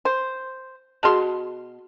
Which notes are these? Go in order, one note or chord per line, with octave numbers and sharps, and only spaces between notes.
C5
B2 F#4 G#4 A5 C6